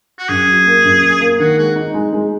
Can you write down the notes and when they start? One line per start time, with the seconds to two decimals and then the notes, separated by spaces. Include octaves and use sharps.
0.19 F#4
0.29 F#2 G#4
0.47 F#3
0.66 A#3
0.84 F#2
1.02 F#3
1.20 A#3
1.39 D#3 F#4
1.58 G#3 F#4
1.76 D#4
1.94 G#3
2.13 G#3